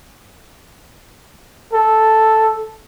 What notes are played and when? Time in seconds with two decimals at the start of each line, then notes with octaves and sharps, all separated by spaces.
1.73 A4